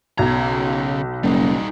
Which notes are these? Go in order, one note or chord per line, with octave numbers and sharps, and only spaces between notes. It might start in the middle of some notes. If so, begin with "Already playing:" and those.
B1 C#3 A#5 G#6
F#1 G3 D#4